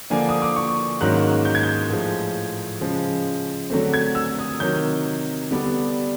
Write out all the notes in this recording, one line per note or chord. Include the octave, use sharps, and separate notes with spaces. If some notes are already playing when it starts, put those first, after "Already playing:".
D3 F3 A#3 D4 G#5
D#6
D6
C#6
G#2 D#3 F#3 A#3 C#4 F#6
G6
G#6
G6
A2 F3 G#3
C#3 F3 G#3
D3 F#3 A3 C4
G#6
E6
D#6
C3 D#3 F#3 G6
D3 G3 B3 D4